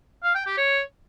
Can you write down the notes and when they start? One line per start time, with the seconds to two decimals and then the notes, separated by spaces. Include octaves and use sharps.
0.24 F5
0.35 G5
0.46 G4
0.58 C#5